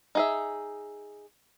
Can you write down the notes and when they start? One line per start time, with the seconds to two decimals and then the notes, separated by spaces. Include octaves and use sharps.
0.15 D#4 G#4 E5